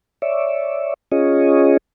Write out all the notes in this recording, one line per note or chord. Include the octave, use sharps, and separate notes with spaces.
C#5 D5 E5
C#4 F4 G#4 C#5 D#5